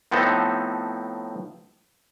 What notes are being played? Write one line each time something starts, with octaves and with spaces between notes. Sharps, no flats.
A2 F3 B3 C4 D#4 A4